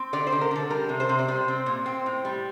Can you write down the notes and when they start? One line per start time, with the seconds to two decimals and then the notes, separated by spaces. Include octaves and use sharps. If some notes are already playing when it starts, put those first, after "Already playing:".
Already playing: C4
0.13 D3 D5
0.27 C5
0.32 D3
0.41 A#4
0.51 D3 A4
0.70 G3 A#4
0.89 C3
1.00 C5
1.09 C3
1.19 D5
1.28 G3 C5
1.48 C4
1.66 A#2
1.86 C4
2.06 A2
2.25 G3